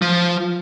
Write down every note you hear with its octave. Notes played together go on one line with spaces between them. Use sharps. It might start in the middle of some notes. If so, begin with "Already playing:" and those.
F3